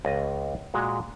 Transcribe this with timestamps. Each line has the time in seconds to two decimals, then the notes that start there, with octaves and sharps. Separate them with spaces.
0.05 C#2 D#5
0.74 A#2 G#3 F#4